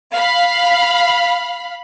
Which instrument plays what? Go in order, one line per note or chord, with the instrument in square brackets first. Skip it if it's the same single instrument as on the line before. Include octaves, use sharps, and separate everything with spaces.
[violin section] F5 B5